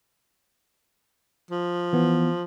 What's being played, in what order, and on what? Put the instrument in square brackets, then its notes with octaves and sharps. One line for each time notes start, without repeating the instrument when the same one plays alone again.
[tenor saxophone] F3
[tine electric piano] E3 B3